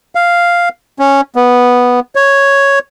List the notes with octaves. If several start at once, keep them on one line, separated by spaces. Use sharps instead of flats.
F5
C#4
B3
C#5